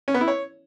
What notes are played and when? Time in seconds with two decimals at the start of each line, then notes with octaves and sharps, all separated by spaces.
0.08 C#4
0.14 B3
0.21 E4
0.28 C#5